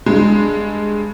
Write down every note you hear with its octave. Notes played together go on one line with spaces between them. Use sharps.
G2 G#3